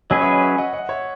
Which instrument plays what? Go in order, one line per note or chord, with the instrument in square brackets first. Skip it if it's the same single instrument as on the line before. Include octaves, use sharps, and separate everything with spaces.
[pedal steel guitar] F#3 C#4 G#4 B4 [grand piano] D#5
[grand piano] C#5 E5
D#5
C#5 E5
D#5 F#5
D#5 F#5
C#5 E5